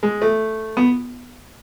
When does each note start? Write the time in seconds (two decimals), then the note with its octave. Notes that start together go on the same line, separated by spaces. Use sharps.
0.03 G#3
0.22 A3
0.77 B3